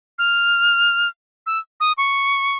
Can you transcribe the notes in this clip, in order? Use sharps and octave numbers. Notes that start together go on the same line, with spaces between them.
F6
E6
D#6
C#6